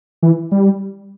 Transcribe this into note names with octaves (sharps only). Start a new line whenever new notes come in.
E3
G3